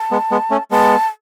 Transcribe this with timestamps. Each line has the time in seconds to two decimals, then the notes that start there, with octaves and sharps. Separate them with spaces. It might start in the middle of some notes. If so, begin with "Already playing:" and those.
Already playing: A5
0.11 G#3 B3
0.31 G#3 B3
0.51 A3 C#4
0.71 G#3 B3 A5